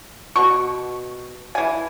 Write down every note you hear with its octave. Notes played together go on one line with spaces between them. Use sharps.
B2 C#6
E3 G#5